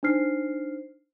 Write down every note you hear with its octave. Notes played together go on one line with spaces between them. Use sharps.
D4 D#4 C5 F6 C7